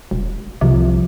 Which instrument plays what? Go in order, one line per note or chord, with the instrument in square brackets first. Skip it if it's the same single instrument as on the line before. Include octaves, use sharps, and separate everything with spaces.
[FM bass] E1
[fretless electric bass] C2 F3 [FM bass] C3